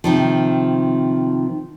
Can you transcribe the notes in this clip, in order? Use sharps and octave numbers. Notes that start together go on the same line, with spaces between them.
C3 D#3 F3